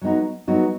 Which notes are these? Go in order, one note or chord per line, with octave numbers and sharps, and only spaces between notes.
F#3 B3 D#4 F#4
F#3 B3 D#4 F#4